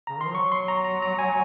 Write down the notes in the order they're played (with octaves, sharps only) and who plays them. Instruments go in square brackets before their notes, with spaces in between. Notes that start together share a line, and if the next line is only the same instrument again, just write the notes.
[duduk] C#3 [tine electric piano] A#5
[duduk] D#3 [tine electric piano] C6
[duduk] F3
[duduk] F#3 [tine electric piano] C#6
[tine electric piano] C6
A#5
A#5
A#5
G#5